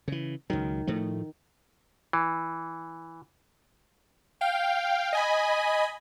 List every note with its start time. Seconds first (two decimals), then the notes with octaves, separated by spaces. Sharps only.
0.08 C#3 E3
0.50 C#2 D#3 F#3
0.87 A2 F3 A3
2.13 E3
4.41 F5 G5
5.13 D#5 G#5 B5